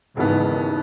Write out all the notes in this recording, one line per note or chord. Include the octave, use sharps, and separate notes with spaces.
E1 D#2 G#2 C#3 E3 B3